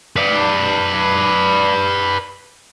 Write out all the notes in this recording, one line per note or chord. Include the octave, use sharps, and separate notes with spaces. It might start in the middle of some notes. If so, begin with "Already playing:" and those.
B4 D5